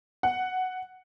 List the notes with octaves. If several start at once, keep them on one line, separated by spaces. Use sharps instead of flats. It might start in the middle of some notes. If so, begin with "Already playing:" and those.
F#5